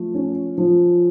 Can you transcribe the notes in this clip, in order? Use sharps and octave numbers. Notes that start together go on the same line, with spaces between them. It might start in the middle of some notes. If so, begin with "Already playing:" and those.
Already playing: F3 A3
C#4
F3